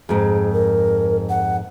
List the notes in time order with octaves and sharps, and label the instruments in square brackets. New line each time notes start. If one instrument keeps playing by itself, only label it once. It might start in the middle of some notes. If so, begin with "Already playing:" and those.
[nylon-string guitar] F2 G#2 [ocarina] G#4
[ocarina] A#4
F#5